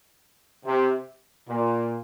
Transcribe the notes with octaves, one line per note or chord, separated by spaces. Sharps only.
C3
A#2